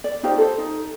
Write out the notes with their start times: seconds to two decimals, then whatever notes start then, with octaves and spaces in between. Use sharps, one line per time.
0.04 D5
0.23 D#4 F4 G4 C5
0.38 A4 C5
0.58 D#4